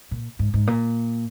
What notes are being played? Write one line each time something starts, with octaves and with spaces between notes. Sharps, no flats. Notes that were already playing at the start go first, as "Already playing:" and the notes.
A#2
G#2
G#2
A#2